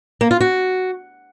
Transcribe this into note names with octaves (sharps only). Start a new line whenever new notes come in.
A#3
F4
F#4